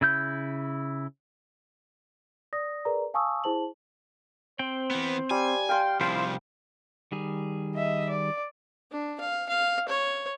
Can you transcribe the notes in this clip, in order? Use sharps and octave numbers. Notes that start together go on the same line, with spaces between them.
C#3 E4 G6
D5 D#6 A#6
G#4 A#4 B4 D5 A#5
F5 G#5 A5 C#6 D#6 E6
E4 G#4 C5 A5 F#7
C4 C5 G5
E3 B3
G3 G#5
F5 G5 C6
C2 F3 E4 F4 C5 G5
D#3 G3 G#4
D#5 E5
D5
D4
F5
F5
C#5